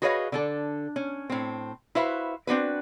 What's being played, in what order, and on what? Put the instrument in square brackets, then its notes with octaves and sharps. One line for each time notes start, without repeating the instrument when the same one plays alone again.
[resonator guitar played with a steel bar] F#4 G#4 B4 C#5 D#5 F5
D3 D4 A4
C#4
A2 C4
E4 F#4 B4 C5 E5 F5
C4 D4 F#4 B4